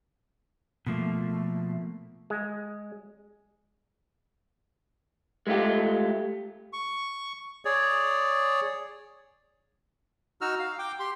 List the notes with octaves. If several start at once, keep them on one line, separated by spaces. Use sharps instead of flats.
B2 F3 A3 A#3
G#3
G#3 A3 D#4 F4 G4
C#6
G#4 C#5 D5
D#4 F#4 E6 F6
F5
G5 D6
G4 C6